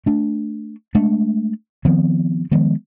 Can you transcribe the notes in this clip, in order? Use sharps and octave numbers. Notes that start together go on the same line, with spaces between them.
A3 D4
G#3 A3 D4
D#3 F3 B3 C4
D#3 F3 G#3 B3